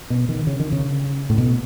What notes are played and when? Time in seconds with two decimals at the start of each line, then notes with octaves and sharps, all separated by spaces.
0.10 B2
0.29 D#3
0.47 C#3
0.60 D#3
0.72 C#3
1.30 A2
1.38 B2